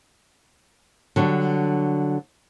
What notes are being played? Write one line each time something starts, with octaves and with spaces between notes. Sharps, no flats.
D3 F#3 G3 D4